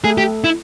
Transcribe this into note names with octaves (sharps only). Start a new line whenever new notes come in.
A3 G#4 A4
G4
E4